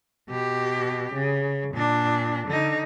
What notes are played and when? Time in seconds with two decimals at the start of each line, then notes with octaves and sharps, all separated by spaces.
0.29 B2 G4
1.13 C#3
1.74 A#2 D4
2.47 D3 D#4